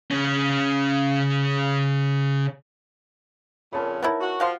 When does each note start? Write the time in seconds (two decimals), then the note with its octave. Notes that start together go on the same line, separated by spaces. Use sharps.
0.11 C#3 C#4
3.73 F2 A#2 C#3 A#4 A5 B5
4.03 B3 D#4 E4 A#4 C#5 A5
4.21 F#4
4.40 F3 F#4 F5 C6